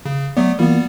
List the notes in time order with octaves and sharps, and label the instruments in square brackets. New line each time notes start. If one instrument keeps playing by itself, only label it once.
[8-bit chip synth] C#3
[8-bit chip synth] F#3 A3 B3 [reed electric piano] D5
[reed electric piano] E3 A#3 F4 [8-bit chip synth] G3 B3